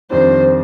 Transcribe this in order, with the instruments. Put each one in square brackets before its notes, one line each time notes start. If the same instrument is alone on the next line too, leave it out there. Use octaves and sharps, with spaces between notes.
[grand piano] F2 D#3 G3 D4 [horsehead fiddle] C5